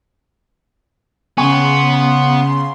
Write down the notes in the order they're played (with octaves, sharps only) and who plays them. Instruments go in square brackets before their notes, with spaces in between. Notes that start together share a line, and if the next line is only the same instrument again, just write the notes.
[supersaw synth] C#3 C6 [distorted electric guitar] B3 [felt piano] G5 G#5 C#6